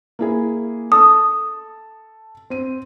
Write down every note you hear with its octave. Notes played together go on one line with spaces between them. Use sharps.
A#3 E4 G#4
A4 A5 D#6 E6
C4 D#7